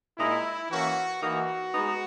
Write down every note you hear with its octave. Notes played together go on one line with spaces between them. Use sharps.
A#2 G#3 D#4 E4
E3 A#3 C#4 E4 F#4
E3 A#3 D#4 F#4
G#3 B3 D#4